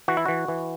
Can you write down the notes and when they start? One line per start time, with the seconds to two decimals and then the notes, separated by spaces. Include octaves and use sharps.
0.08 E3 F#4
0.17 E4
0.25 E3 F#4
0.48 E3